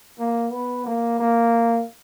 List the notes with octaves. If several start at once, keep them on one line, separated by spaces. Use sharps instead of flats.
A#3
B3
A#3
A#3